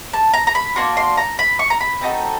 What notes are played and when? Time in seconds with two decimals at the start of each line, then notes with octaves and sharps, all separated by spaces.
0.13 A5
0.34 A#5
0.47 A#5
0.55 B5
0.76 A#3 D4 F#4 C6
0.97 C6
1.17 A#5
1.39 B5
1.59 C#6
1.70 A#5
1.80 B5
2.01 C4 D#4 F#4 A4